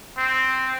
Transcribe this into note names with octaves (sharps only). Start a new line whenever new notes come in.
C4